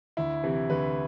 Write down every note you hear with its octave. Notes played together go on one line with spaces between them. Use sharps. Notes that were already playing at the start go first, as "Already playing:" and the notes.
D2 E4
C3 E3
D2 B4